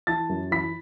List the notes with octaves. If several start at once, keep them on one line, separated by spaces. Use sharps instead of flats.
E3 A5 A6
F#2
E3 B5 B6